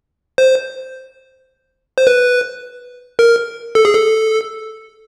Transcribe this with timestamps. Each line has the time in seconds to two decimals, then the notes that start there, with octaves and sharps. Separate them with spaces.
0.38 C5
1.98 C5
2.07 B4
3.19 A#4
3.75 A4
3.85 G#4
3.95 A4